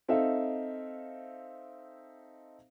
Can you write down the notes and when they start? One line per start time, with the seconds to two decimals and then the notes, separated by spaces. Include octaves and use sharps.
0.09 C4 D#4 A4 E5 F5